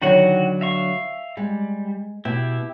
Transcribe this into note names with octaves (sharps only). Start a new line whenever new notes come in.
D3 D#3 F#3 E4 F#4 F#5
E5 F5 C#6
G3 G#3
B2 E4 G4